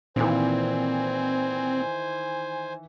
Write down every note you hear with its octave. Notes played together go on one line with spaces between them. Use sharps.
A#2 D#3 E3 C4 C5 G#5